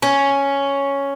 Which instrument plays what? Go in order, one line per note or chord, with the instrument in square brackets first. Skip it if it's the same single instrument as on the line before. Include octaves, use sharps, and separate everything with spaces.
[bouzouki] C#4